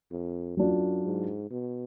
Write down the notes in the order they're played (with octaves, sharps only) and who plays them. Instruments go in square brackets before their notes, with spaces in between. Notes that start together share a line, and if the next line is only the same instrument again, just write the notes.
[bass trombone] F2
[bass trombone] F#2 [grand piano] F#3 D4 F4
[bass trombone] G#2
B2